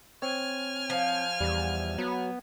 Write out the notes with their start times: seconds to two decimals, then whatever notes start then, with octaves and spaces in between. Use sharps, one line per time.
0.22 C4 C#5 G#5 F6
0.90 F3
1.41 E2 G3
1.98 F#3 B3